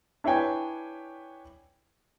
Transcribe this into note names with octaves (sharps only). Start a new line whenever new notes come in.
D4 E4 B4 C#5 G5 G#5